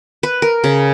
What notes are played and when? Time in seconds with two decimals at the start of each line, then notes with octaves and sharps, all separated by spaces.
0.23 B4
0.42 A#4
0.64 C#3